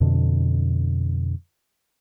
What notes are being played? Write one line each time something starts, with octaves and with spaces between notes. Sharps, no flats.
F2 B2 D3